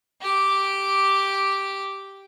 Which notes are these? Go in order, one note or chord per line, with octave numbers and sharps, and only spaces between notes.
G4 D6